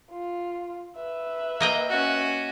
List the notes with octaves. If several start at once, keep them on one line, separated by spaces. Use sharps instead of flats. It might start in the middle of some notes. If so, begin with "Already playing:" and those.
F4
B4 E5
A#3 D#5 G5
C#4 F#4